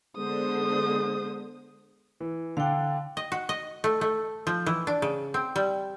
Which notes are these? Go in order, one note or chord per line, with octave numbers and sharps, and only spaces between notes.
D3 G#3 B3 C5 D#6
E3
D3 D4 F5 G5
D#5
F#4
D#5
A3
A3
F3
E3
D4
C#3
C4
G3